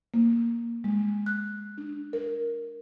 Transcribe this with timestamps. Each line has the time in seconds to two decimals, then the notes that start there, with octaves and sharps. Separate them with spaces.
0.14 A#3
0.84 G#3
1.26 F#6
1.78 D4
2.13 A#4